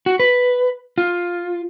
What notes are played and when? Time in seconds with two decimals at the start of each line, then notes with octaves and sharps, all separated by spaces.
0.06 F#4
0.20 B4
0.98 F4